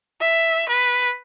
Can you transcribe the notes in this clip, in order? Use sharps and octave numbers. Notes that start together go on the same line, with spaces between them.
E5
B4